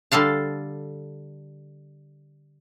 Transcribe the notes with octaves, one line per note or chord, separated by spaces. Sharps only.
D3 G3 A4 F5 A5